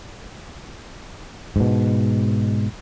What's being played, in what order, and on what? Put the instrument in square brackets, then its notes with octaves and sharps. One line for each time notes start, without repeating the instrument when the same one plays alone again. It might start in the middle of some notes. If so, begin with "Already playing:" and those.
[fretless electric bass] G#2 B2